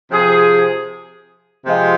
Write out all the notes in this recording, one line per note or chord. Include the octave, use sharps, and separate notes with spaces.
C3 F3 C4 G#4
C3 F3 G#3 F4